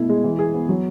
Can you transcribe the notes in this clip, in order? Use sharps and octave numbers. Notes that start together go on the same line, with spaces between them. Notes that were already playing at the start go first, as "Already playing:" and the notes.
Already playing: B2 A3 E4
G#3
E3
G#4
B3
F#3